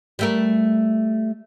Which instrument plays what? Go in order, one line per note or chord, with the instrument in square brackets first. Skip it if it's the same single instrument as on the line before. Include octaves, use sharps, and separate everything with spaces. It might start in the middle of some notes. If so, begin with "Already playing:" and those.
[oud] G3 A3 A#4